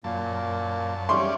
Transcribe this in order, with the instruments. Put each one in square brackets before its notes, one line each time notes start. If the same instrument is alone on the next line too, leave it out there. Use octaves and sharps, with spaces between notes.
[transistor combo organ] F#2 A5 [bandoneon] A#2 A#3
[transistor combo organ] G3 C#4 D5 [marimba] E5 C#6 [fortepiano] C6